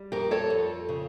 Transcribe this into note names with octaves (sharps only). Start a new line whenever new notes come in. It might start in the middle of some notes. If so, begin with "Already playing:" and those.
Already playing: G3
F2 G4 A#4
A4 C#5
F2
C#3